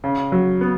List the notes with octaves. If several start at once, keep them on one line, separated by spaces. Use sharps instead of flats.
C#3
F#3
B3